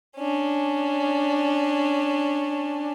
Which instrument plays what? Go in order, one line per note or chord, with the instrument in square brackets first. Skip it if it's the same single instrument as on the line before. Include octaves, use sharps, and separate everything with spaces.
[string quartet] C#4 D4